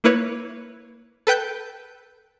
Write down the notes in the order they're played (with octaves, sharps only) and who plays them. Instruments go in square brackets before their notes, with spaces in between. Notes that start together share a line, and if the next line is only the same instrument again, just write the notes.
[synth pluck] A#3 E4 B4 C#5
A4 B4 G5 F#6 G6